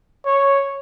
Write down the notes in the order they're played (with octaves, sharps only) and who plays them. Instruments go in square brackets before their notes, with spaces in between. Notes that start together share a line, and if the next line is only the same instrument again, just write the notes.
[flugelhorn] C#5